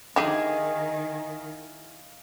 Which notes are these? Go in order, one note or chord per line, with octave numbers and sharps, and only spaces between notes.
D3 D#3 E4 G4 G#4 D#5 F5